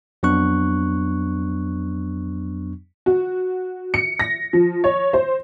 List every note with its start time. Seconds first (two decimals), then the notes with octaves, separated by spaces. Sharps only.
0.23 F2 F#3 B3 D4 C#6 F#6
3.06 F#4
3.94 C#7
4.19 A#6
4.53 F3
4.84 C#5
5.13 C5